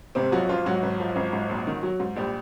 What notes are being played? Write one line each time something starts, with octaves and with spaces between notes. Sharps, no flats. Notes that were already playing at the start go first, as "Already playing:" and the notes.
G#1 C3 C4
F3 F#3 F#4
G#1 F3 F4
G#2 F#3 F#4
G#1
F3
G#1
G#2
A#1
D#3
F#3
G#2
A#1 G3 G4